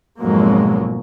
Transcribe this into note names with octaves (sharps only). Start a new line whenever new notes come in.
G#1 F2 B2 F#3 G#3 A#3